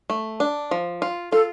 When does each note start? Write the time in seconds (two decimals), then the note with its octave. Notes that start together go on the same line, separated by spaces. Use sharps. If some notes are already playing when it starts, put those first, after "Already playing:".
0.10 A3
0.40 D4
0.71 F3
1.02 F4
1.32 F4 A4